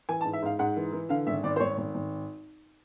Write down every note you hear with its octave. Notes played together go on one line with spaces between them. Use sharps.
E3 G#5
A5
G#2
E5
G#2 F5
G#2 F#5
E3
E3
D3 F5
G#1 E5
G#1 D5
C5
G#1 C#5
G#1
G#1